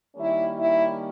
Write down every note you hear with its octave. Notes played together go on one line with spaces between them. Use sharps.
D#3 G3 A#3 C#4 E4
E4